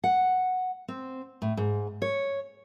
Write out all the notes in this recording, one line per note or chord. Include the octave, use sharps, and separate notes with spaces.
F#5
C4
A2
G#2
C#5